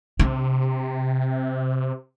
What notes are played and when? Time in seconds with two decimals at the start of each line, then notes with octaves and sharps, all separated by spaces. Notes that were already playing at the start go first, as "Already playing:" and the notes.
0.19 C3 D4